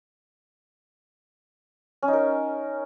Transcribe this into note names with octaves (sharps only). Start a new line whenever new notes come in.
C#4
D#4
A#4